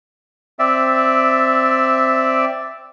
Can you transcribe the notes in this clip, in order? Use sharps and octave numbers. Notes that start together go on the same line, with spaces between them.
C4 D5 E5